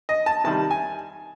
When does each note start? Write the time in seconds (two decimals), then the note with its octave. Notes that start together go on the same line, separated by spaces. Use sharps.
0.09 D#5
0.26 A5
0.44 C3 D#3 G3 A5
0.71 G#5